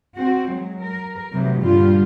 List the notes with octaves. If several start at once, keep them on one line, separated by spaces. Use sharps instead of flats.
C4 F#4
F#3 G#3
A#4
C3 E3 F#3 A3 D#4
G2 A#2 D3 G3 F4